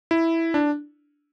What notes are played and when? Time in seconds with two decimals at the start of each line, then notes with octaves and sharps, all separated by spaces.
0.11 E4
0.54 D4